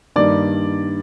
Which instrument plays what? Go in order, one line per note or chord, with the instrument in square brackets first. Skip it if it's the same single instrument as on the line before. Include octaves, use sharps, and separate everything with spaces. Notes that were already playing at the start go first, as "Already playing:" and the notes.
[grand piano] G2 D#3 G3 A#3 D5